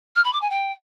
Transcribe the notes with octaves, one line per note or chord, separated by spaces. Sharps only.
F6
B5
D6
G#5
G5